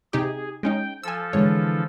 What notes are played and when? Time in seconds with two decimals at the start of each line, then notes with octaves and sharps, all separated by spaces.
0.13 C3 D#4 G4 G#4
0.63 G#3 C#4 D#4 G5
1.03 F3 A4 G#5 E6
1.33 D3 E3 G#3 C#5